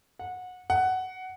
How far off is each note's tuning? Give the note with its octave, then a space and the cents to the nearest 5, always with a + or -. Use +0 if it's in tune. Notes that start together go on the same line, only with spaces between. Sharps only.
F#5 -20
F#5 +10